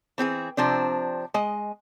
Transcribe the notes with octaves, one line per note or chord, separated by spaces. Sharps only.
E3 C4 G4 G#4
C3 F3 C4 D4
G#3 D#5